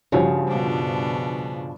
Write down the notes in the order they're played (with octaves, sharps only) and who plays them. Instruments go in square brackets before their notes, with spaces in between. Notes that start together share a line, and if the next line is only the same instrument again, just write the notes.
[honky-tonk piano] G2 F3 [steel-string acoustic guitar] C#3 [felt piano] F#4 G4 C#5
[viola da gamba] B2 D4